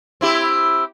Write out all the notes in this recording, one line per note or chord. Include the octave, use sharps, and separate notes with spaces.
C4 E4 G4